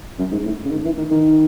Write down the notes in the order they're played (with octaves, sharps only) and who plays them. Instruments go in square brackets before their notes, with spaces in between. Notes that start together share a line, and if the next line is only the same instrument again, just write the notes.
[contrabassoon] F#2
G#2
A2
C#3
D#3
E3
D#3
D#3